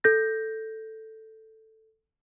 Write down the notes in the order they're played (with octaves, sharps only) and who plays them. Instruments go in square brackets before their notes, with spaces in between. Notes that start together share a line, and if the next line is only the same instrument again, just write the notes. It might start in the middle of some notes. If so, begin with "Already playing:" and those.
[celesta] A4 G6 A#6